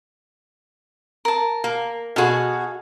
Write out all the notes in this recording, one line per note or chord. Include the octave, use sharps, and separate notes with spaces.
A#4 A5
A#3
B2 F#4 G#4 A4 F5